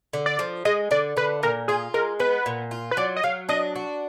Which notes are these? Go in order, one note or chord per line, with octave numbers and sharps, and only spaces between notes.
D3
D5
F3
G#3 D#5
D3 D5
D3 B4
A#2 A#4
F4 G#4
G#3 A#4
B3 B4
A#2
F4
B4
F#3 D5
D#5
F#3 F5
D4 D#5
F#4